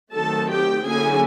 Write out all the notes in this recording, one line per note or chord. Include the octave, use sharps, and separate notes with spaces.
D#3 F#3 A3 C4 A4 A5
G4 G5
D3 F#3 A#3 C#4 E4 G#4 G#5